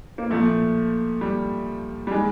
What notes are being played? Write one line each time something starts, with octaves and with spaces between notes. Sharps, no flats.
A#3
A#2 F3 A3
G3
G3
D#3 G#3